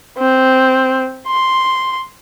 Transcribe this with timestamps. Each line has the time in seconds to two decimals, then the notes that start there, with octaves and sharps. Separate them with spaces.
0.18 C4
1.27 C6